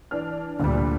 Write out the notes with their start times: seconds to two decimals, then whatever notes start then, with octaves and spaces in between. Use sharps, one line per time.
0.11 E3 D4 F6
0.59 D2 A#2 D3 G3